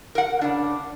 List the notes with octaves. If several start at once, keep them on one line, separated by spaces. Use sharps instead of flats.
A#4 F#5
C#3 D4